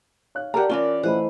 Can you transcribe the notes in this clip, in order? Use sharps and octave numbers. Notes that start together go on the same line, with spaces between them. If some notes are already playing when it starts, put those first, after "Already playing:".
C#5 F5 F#6
D4 F#4 G4 A#4 A#5
E3 C#4 F4 G4 A#4 D5 G7
E3 A3 C5 D#5 F#5 B5